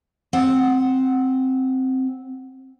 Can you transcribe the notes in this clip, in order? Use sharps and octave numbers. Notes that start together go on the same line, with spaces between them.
C4 F#5